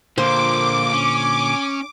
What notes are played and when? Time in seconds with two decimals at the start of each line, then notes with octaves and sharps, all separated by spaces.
0.18 A#2 D3 F3 A#3 C5 D6
0.93 C#4